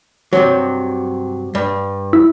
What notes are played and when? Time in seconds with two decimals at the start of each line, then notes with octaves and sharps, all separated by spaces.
0.33 G2 C3 F#3
1.55 G2
2.13 E4